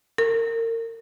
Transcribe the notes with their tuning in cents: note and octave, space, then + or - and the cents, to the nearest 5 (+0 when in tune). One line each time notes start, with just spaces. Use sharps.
A#4 -35